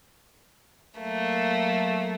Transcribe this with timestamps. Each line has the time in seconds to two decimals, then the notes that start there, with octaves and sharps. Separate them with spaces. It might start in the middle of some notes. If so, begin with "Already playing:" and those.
0.98 F#3 A3 A#3